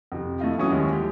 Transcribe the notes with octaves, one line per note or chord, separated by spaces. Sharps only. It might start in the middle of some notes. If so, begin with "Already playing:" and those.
F2 C3
A3 E4 D#5 F5
E3 F#3 C#4 E4 C#6 D#6
D#2 F3 G3 G#3
G4